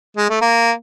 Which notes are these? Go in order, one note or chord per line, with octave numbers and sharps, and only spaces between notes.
G#3
A3
A#3